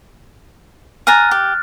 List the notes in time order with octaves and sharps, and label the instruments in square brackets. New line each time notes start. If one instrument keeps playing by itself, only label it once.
[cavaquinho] G#5 A#5 D#6 [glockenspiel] F6 F#6 A6
[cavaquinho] G4